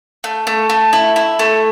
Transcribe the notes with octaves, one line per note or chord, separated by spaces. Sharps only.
A3
A3
A3
E4
E4
A3